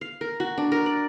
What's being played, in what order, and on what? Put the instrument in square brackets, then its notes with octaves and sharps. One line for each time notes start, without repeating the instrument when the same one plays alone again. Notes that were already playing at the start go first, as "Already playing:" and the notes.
[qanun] F5
A#4
F#4
D4
A#4
D5